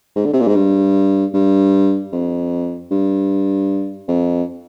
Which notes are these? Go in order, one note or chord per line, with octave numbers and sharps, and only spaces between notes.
G#2
D3
C3
A#2
G#2
G2
G2
F2
G2
F2